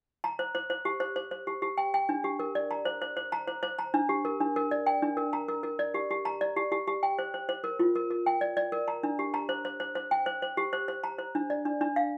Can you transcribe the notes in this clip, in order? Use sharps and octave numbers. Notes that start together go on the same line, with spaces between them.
A#5
C5
C5
C5
G4
C5
C5
C5
G4
G4
G5
G5
D4
G4
A#4
D5
A#5
C5
C5
C5
A#5
C5
C5
A#5
D4
G4
A#4
D4
A#4
D5
G5
D4
A#4
A#5
A#4
A#4
D5
G4
G4
A#5
D5
G4
G4
G4
G5
C5
C5
C5
A#4
F4
A#4
A#4
G5
D5
D5
A#4
A#5
D4
G4
A#5
C5
C5
C5
C5
G5
C5
C5
G4
C5
C5
A#5
C5
D4
D5
D4
D4
F5